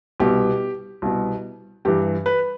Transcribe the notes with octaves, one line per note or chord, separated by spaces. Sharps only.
C2 B2 G4
C2 B2
G2 E3 G4
B4